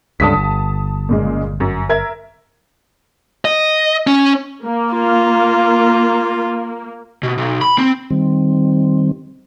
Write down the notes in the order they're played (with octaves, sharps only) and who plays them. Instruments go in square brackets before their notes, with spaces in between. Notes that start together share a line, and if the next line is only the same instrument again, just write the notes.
[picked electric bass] C#2 G2 D3 [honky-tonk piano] A5 D#6 B6
[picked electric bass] G1
[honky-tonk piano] A#2 C#3 G#3
F#2
A#4 E5 G#6
[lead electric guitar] D#5
C#4
[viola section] A#3
[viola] F4
[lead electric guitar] B2
B1
B5
C4
[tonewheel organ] D#3 G3 C4